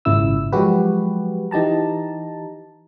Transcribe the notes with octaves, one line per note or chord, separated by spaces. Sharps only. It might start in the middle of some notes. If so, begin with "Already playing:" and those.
G#1 A#2 C#3 E4 E6
F3 F#3 G#3 F#4 G4 B4
E3 D#4 G4 A5 A#5